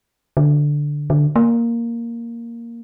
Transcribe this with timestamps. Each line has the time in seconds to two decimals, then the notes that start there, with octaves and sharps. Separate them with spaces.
0.37 D3
1.10 D3
1.36 A#3